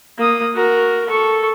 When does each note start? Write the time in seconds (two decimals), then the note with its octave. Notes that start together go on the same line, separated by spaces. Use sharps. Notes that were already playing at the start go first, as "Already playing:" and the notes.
0.18 A#3 D#6
0.55 F#4 A#4
1.08 A4 C#6